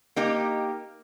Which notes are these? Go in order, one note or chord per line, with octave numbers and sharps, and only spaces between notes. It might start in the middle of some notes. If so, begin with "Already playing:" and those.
A#3 D#4 G4